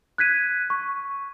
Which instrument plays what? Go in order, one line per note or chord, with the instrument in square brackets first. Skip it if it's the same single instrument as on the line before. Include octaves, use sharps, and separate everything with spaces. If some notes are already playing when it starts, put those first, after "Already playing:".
[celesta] F#6 G#6 B6 D#7
C#6